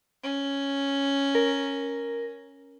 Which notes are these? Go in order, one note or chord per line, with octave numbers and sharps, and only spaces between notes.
C#4
A#4